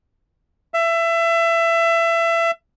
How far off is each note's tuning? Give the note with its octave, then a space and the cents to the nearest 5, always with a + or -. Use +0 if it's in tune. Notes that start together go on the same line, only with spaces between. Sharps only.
E5 +25